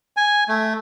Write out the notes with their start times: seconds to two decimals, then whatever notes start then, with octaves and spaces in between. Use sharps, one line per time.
0.17 G#5
0.49 A3